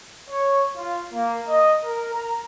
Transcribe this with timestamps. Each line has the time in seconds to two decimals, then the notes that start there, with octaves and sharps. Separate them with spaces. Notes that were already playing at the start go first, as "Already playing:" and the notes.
0.31 C#5
0.77 F4
1.14 A#3
1.49 D#5
1.85 A#4
2.15 A#5